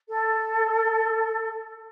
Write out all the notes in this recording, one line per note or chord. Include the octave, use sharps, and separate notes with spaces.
A4